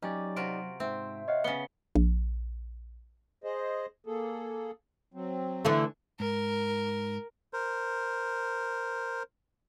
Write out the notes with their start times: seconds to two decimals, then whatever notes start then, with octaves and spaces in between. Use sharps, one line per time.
0.02 F#3 C#4 D#4 G4 D5
0.36 C3 F4 F#4 D7
0.80 G#2 C4 E5
1.28 C#5 D#5 F5 F#5
1.44 C#3 B3 C#7 G7
1.95 A#1
3.44 G#4 C5 D#5
4.06 A#3 G#4 A4
5.14 F#3 C4
5.65 D3 E3 A3
6.20 G#2 A#4
7.53 A#4 C5